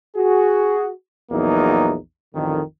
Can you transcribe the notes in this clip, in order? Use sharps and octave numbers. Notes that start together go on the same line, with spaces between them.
F#4 G#4
A#1 E2 F#3 A#3 D#4
A1 F2 D3 D#3